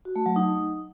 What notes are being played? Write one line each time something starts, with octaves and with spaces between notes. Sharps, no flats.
F#4
A3
F#3
D#4